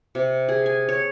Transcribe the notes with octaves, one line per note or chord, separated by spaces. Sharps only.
C3
G#4
G#5
C#5